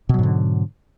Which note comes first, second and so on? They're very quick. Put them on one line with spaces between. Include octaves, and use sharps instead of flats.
B2 F#3 G#2 D3